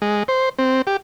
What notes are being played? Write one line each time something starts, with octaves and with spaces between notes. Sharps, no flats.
G#3
C5
C4
G4